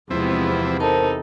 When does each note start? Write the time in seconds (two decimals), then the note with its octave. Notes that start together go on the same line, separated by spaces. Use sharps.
0.11 E2 C3 F3 G#3 B3 C4 E4
0.80 D#4 A4 A#4 C5 A5